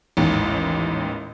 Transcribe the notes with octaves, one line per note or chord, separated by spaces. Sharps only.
A1 D#2 G#2